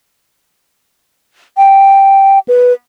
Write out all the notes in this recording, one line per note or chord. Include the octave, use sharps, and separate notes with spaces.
G5
B4